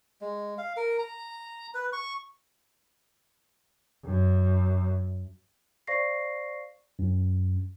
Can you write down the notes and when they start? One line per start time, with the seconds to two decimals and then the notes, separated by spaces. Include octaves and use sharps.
0.21 G#3
0.58 F5
0.77 A#4
0.99 A#5
1.74 B4
1.93 C#6
4.06 F#2
5.87 C5 D5 F5 C#6 A#6 C7
6.99 F#2